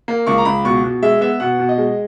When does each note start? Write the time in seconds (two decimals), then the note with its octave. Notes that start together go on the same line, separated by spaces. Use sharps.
0.08 A#3
0.27 C#2 C#6
0.38 A#5
0.45 C#2 B5
0.65 B2 C#6
0.84 B2
1.03 G#3 E5
1.21 B3 E5
1.40 B2 F#5
1.59 B2
1.69 D#5
1.78 G#3